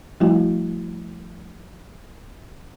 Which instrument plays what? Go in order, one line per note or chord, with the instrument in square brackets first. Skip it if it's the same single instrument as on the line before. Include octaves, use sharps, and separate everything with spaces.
[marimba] F3 G3 A3 E4 F#4